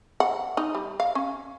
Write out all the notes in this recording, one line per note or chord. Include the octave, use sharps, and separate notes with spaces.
F#5
D#4
G3
F5
C#4